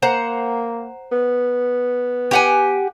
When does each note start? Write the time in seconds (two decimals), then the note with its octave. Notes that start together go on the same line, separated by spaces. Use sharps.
0.02 A#3 C5 F#5 A#5
1.12 B3
2.31 G4 F#5 G#5